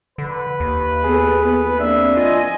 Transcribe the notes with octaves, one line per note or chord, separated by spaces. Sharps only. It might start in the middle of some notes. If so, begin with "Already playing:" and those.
D3 B4
D#2
B3 G#4 A4
B3 B4
A#3 C4 D4 E5
F4 D#5 G#5